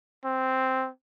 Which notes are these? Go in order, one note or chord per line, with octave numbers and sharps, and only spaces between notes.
C4